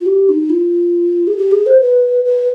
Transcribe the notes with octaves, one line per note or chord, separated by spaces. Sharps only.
F4
G4
D#4
F4
G#4
G4
G#4
C5
B4
B4